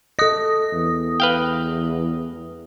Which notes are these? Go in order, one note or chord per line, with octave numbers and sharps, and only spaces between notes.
A4 D#5 D#6 A#6
E2
B4 F5 G5